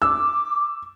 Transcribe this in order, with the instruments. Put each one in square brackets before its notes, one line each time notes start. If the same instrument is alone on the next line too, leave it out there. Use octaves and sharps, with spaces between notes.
[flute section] D6 [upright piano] E6